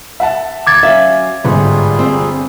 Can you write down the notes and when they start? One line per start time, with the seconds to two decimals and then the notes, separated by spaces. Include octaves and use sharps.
0.20 E5 F#5 A5
0.67 D#2 A#5 D6 G#6 A6
0.83 F#3 C#4 E5 F5
1.45 G1 G#2 G3 F4 G#4
1.99 C4